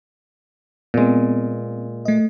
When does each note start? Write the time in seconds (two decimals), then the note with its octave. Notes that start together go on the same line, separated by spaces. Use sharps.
0.94 A#2 G#3 B3 C4
2.05 A3 D#5